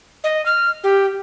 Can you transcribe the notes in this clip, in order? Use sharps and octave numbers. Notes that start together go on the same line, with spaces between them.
D#5
F6
G4